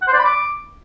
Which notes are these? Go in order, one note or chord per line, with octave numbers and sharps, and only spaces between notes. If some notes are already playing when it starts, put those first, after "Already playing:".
F#5
C5
D5
B5
D6